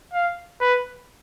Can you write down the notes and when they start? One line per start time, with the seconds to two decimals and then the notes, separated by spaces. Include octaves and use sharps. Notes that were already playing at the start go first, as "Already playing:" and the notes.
0.14 F5
0.61 B4